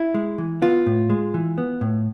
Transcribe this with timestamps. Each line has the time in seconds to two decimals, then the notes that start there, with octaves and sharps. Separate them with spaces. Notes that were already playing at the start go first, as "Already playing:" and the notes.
Already playing: E4
0.14 G#3
0.38 E3
0.62 B3 F4
0.86 A2
1.10 G#3
1.34 E3
1.58 B3
1.81 A2